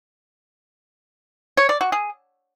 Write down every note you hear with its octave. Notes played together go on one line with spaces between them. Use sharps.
C#5
D5
F#4
G#4